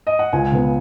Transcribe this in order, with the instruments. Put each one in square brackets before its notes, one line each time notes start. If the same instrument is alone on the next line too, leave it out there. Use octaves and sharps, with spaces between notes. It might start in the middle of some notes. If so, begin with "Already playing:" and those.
[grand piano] D#5
F#5
C#2 G#5
C#3 B3